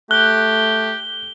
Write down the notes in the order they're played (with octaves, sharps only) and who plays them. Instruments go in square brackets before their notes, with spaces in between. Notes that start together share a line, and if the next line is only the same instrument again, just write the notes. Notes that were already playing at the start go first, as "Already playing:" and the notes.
[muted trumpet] A3 [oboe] G4 [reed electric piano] F#6 [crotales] G7